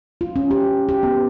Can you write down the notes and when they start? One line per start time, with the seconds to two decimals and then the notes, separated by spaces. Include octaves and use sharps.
0.21 F4
0.36 C#4
0.51 G4
0.89 G4
1.03 B3